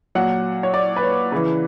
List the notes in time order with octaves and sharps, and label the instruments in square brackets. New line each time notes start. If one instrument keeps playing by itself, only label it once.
[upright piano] A#2 F#3 F#5
C#5
D5
B4
C#5
C#3 E3 B4